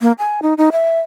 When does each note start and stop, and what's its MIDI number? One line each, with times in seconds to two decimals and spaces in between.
0.01 0.12 58
0.19 0.40 80
0.42 0.54 63
0.58 0.69 63
0.72 0.99 76